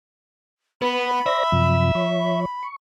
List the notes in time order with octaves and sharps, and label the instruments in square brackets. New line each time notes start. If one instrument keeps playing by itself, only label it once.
[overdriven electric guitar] B3 [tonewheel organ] B4 [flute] B5
[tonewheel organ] C5 D5 A#6 [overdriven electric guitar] E5
[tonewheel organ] F#2 C3 F3
F3 C#5
[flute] B5
[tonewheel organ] C#6